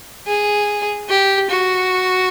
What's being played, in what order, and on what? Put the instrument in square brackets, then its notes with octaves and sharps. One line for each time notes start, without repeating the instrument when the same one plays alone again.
[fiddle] G#4
G4
F#4